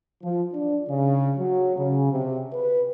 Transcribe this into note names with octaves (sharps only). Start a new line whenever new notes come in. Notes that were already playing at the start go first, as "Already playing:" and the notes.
F3
D4
C#3
F#3
C#3
C3
B4